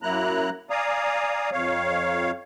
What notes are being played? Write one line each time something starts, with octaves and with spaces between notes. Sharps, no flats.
F#2 F#3 A#3 E4 A#5 F#6
D5 F5 G#5 A#5 D#6
F2 C#5 F5